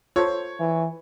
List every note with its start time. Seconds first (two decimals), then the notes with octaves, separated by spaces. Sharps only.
0.16 F4 A4 C5 C#5
0.60 E3